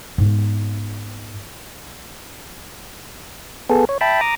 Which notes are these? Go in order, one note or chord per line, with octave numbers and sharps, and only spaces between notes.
G#2 B3
B3 G#4 A4
C#5
E5 G5 A5 B5
A#5 D6 D#6